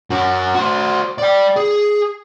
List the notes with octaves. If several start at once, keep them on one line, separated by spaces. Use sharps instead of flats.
F#2 F#4
F#4 C5
D5 G5
G#4